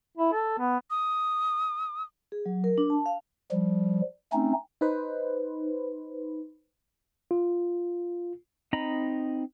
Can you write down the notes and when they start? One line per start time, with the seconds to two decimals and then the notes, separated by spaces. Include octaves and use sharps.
0.18 E4
0.33 A4
0.59 B3
0.90 D#6
2.32 G#4
2.46 F#3
2.64 A#4
2.78 D4
2.90 A5
3.06 F5
3.51 F3 G3
4.33 A3 C4 C#4 D#4
4.81 D#4 B4 C5
7.31 F4
8.73 C4 D#4 D#5 A#5 B5